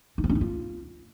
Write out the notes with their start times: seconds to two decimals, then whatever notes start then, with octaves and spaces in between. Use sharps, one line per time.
0.18 D#4
0.24 C4
0.30 C#4
0.35 D#4
0.41 F4